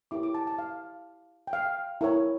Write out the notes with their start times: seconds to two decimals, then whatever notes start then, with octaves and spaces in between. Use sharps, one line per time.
0.11 E4 G4 A#4 C#5 D6
0.23 D6
0.34 A5
0.47 A5
0.58 F5
1.47 G5
1.53 F5
2.01 E4 A#4 C#5